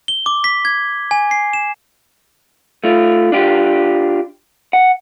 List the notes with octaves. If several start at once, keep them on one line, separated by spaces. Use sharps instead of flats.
G7
D6
B6
G#6
G#5
C7
E7
A3 F4
D4 F4 G4
F#5